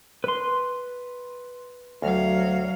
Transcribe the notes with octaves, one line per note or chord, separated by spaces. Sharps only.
B4 C6
D2 F#3 F5